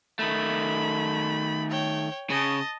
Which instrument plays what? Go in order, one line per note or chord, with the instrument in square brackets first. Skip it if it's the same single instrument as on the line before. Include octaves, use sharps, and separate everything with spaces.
[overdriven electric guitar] D#3 A3 [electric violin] B5
[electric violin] C#5 G5
[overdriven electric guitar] C#3 [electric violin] D#5 A5